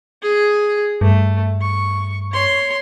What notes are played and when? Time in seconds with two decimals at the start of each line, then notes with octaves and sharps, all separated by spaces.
0.23 G#4
1.01 G2 A3
1.61 C#6
2.33 C#5 C6